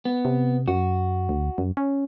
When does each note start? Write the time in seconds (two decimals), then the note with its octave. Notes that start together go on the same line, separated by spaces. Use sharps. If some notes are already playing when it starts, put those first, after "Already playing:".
0.05 B3
0.25 C3
0.68 F#2 F#4
1.29 D2
1.58 F#2
1.77 C#4